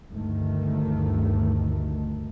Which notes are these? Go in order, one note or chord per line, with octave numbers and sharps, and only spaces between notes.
D2 G2 D#3 A3